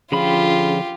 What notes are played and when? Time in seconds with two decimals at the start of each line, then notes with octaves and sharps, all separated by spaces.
0.12 D3 F3 C#4 F4 G4 G#4 B5